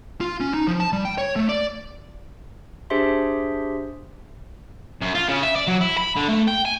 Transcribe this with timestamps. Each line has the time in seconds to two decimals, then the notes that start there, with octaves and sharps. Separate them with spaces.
0.21 F4
0.40 C#4
0.53 D#4
0.67 F3
0.80 A5
0.93 G3
1.05 G5
1.18 C#5
1.36 A3
1.49 D5
2.90 D4 G4 G#4 C5 E5 C6
5.01 F#2
5.15 F4
5.28 C#3
5.43 E5
5.56 D5
5.68 F#3
5.81 E4
5.98 B5
6.16 D3
6.29 A3
6.48 G5
6.65 G#5